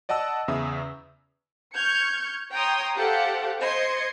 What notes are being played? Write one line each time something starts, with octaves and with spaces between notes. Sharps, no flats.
D5 D#5 F#5 A5 E6
E2 C#3 E5 D#6
C#6 F6 G6 G#6 C#7
C#5 G5 A#5 C6 D#6
G4 A4 C5 F5 F#5
C5 D#5 C6 G#6 C#7